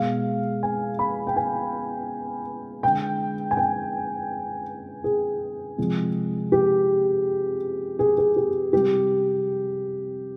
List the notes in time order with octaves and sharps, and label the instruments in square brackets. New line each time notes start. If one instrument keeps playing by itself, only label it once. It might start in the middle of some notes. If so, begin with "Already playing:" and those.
Already playing: [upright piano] B2 G#3 F5
G#5
B5
G5
G#5
D3 G#3 G5
G#5
G5
G#4
C3 F3 G#3
G4
G#4
G#4
G4
C3 G3 G4